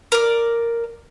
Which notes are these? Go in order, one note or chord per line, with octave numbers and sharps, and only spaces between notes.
A#4 D5